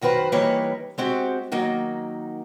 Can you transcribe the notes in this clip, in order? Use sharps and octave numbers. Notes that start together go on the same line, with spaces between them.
F#2 D#3 F#4 B4 C5
E3 G3 A#3 D#4 B4 C#5
G#3 C4 F#4 G4
D#3 F#3 A#3 D#4